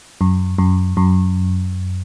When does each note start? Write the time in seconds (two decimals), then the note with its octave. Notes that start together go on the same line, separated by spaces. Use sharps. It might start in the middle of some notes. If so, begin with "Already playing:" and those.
0.21 F#2
0.58 F#2
0.97 F#2